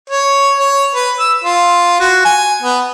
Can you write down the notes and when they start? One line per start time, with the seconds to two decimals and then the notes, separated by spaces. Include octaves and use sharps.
0.10 C#5
0.58 C#5
0.95 B4
1.20 E6
1.44 F4
2.00 F#4
2.25 G#5
2.62 B3